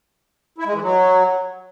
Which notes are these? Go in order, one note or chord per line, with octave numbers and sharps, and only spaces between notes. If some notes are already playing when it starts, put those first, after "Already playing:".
E4
G#3
E3
F#3